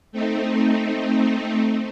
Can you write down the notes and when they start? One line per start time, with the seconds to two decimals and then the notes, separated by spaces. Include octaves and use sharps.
0.12 A3 C4 D#4